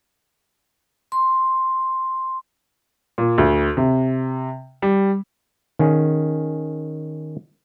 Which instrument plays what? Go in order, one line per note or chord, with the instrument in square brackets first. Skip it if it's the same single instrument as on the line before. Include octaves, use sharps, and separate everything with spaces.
[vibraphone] C6
[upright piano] A#2
D2
C3
G3
[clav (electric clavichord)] D#3 C#4 G#4